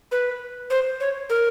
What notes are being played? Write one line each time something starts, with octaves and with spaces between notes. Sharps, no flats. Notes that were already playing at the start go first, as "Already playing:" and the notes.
B4
C5
C#5
A#4